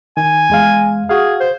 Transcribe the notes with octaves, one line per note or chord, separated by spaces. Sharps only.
D#3 G#5
E2 G#3 F5
F#4 G#4 F5
C5